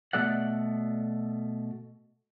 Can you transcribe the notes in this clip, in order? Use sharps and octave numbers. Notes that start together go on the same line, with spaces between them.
B2 A3 A4 D5 F#5